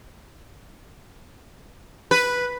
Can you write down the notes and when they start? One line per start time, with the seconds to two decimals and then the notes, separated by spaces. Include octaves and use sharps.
2.11 B4